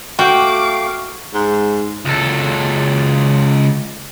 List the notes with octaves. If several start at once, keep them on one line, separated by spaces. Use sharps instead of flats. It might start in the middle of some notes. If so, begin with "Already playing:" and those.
A3 F#4 F5 G5 D6
G#2
C#2 A4